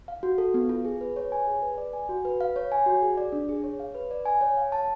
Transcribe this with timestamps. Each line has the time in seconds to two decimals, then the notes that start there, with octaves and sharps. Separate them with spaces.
0.08 F5
0.23 F#4
0.38 A4
0.54 B3
0.69 F4
0.85 G#4
1.01 B4
1.16 C#5
1.32 G#5
1.47 G#4
1.62 B4
1.78 D5
1.93 G#5
2.09 F#4
2.25 B4
2.41 F5
2.56 C#5
2.72 G#5
2.86 F#4
3.02 G#4
3.18 D5
3.32 D4
3.49 G#4
3.64 C#5
3.80 F5
3.95 B4
4.11 D5
4.26 G#5
4.41 C#5
4.57 F5
4.72 A5